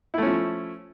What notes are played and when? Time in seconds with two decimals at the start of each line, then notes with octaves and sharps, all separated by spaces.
0.14 E4
0.18 A3
0.22 C#4
0.26 F3